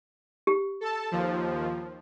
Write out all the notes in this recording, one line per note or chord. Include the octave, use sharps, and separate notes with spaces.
G4
A4 A5
D#2 F3